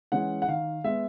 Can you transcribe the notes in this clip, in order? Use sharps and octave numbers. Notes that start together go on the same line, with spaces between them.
E3 G#3 C#4 F#5
F#5
D#3 F5
G#3 B3 E5